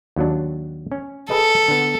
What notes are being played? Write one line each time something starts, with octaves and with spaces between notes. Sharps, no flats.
D#2 F#3 D4
C#4
G#4 A4 B4 D#5
D3 B3